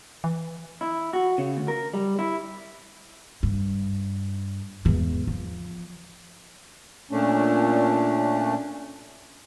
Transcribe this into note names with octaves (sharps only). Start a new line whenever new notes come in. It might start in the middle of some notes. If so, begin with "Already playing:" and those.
E3
E4
F#4
C#3
D2
A#4
G3
E4
G2
E2 G#2
F3
A#2 A3 C#4 D4